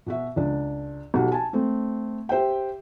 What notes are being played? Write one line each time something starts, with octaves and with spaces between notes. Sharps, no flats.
B2 F#4 E5
C#2 D4
B1 B2 G4 F#5
G#5 A5
A3 C4
G4 C5 E5 G5